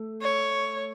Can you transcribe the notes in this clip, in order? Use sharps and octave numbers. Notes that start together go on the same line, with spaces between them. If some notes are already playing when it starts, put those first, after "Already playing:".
Already playing: A3
C#5